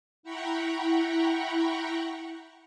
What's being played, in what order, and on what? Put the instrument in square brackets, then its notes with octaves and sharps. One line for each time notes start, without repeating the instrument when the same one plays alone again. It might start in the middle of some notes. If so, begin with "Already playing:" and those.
[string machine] E4 F#5 G5 A#5 B5 C#6